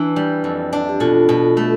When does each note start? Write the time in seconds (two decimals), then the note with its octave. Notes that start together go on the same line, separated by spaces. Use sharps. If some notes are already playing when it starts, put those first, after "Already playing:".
Already playing: E3 D4
0.16 G3
0.44 F2
0.73 D4
0.89 G4
1.00 B2 F4 A4
1.29 B2
1.57 A3